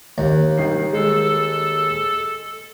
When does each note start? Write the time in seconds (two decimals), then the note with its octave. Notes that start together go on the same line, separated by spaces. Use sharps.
0.18 D#2
0.58 D#3 C7
0.93 G#3 A4